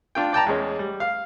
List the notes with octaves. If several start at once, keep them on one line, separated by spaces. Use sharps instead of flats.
D4 F4 G5
D5 G5 A5 A#5
E2 G#3 C#4
G3
F5